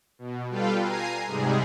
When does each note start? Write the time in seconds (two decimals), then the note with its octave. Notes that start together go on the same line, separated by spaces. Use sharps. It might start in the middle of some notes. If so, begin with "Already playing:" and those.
0.19 B2
0.50 G3 F4 A4 B4 F5 G5
0.81 G#5 A#5 C7 D#7
1.27 G#2 C3 G3 G#3 G#4